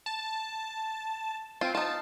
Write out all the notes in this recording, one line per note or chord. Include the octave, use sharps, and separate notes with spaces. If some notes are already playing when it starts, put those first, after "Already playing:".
A5
C4 F4
D#4 F4 A5